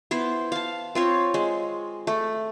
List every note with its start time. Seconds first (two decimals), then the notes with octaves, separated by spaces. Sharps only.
0.11 B3 E4 C5
0.52 F5 A5
0.95 C4 F4 C#5
1.34 G#3
2.07 A3